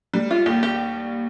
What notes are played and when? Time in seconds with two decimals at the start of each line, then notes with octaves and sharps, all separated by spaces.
0.14 G3
0.31 F4
0.46 D#2 G4
0.63 G4